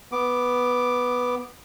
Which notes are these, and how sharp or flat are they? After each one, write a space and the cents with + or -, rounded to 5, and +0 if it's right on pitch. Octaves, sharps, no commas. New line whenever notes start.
B3 +0 D6 +0